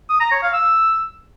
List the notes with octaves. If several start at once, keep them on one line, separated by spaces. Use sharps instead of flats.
D#6
A#5
C#5
F5
E6